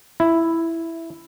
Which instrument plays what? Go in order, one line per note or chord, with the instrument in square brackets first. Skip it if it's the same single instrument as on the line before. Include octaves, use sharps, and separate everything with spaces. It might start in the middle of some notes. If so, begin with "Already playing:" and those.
[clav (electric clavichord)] E4